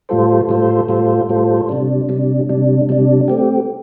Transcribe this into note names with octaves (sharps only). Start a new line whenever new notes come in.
A2 G3 F4 A4 C5
A2 G3 F4 A4 C5
A2 G3 F4 A4 C5
A2 G3 F4 A4 C5
C3 G3 D4
C3 G3 D4
C3 G3 D4
C3 G3 D4
A3 C4 G4